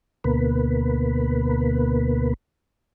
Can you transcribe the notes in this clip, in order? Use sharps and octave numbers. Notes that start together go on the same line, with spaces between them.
D2 B2 A#3 B4